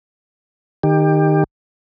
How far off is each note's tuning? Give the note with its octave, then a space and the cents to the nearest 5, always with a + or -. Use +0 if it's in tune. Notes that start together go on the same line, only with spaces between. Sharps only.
D#3 -15 G4 +20